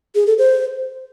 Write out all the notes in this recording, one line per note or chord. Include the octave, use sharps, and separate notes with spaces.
G#4
A4
C5